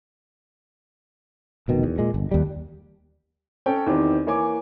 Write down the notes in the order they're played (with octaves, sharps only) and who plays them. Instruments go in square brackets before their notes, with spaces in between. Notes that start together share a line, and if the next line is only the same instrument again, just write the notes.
[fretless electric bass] F1 B2 D#3
E2
A#2 G#3
G1
D#2 G3
[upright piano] C#4 A4 G5
E2 D#3 C4 E4 G4 C5
E3 A#3 C#5 G#5 D6